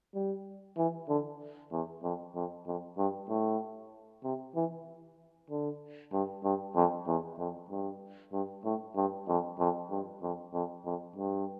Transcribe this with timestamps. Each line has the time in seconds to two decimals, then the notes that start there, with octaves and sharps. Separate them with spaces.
0.14 G3
0.77 E3
1.09 D3
1.72 E2
2.03 F2
2.35 F2
2.66 F2
2.98 G2
3.29 A2
4.24 C3
4.55 E3
5.50 D3
6.13 G2
6.44 G2
6.76 F2
7.07 E2
7.39 F2
7.70 G2
8.33 G2
8.65 A2
8.96 G2
9.28 F2
9.59 F2
9.91 G2
10.22 F2
10.54 F2
10.85 F2
11.16 G2